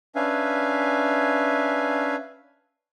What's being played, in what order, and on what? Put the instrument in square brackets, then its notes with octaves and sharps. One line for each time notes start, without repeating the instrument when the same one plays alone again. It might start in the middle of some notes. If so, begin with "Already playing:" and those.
[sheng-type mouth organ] C#4 D4 B4 E5 F5 G#5